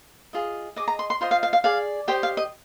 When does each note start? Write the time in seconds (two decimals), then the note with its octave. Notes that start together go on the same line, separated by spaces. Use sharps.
0.33 F4 G#4 D#5
0.76 G#4 D#5 D6
0.88 A#5
0.99 C6
1.10 C6
1.21 F4 C5 D#5 C6
1.31 F5
1.43 F5
1.53 F5
1.64 G#4 D5 F5
2.08 G4 C5 D#5 G5
2.23 F5
2.37 D#5